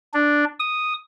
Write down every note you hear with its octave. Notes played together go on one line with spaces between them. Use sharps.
D4
D#6